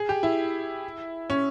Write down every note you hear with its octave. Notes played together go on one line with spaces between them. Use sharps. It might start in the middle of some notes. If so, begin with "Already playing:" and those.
Already playing: G#4
G4
E4
C#4